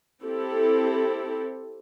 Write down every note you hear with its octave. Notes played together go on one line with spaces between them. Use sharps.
C4 E4 G4 A4